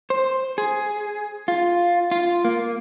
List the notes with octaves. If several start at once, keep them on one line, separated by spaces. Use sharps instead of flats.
C5
G#4
F4
F4
A#3